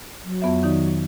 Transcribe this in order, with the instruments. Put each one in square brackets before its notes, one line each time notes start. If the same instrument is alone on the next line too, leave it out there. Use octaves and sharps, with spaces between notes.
[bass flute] F#3
[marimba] F2 B3 E5
D#3 D#4 D5